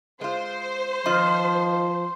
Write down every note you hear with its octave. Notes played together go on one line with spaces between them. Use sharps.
G#3 F4 C5
D#3 F3 F4 D#5 C6